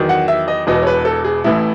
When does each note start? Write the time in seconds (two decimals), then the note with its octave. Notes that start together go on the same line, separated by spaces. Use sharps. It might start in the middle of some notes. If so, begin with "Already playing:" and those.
Already playing: E2 D#3 F#3
0.09 F#5
0.28 E5
0.48 D#5
0.67 E1 E2 B2 D#5
0.82 C#5
0.87 B4
1.05 A4
1.24 G#4
1.44 A1 A2 E3 E4